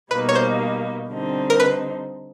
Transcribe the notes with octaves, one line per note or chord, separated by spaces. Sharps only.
B2 G3 A#3 D#4 B4
C#5
C5
D3 G3 C4 D#4
A#4
B4